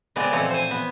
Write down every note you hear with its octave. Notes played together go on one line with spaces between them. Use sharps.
C#3 G#3 B3 C4 G#4 D5
A#2 E3 F3 A3 C4 C#5
C5 G#5
B3